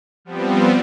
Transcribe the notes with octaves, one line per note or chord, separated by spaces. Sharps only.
F3 G3 B3 C4